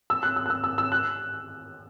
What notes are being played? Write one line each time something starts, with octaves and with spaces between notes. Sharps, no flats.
E6
F#6
E6
F#6
E6
E6
E6
F#6